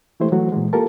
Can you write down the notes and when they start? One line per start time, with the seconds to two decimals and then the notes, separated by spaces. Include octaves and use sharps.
0.20 E3 G#3 A3 E4 G4 C5
0.32 E3 F#3 A3 F#4
0.52 A#2 E3 G#3
0.73 A#3 F4 G4 A4 A#4 A5